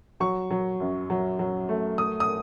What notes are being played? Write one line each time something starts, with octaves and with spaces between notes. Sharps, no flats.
F#3 C#6
F#3
F#2
F#3
F#3
A3
A3 D#6
D#6